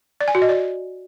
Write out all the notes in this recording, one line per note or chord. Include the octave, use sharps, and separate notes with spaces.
D5
G#5
F#4
D#5
D5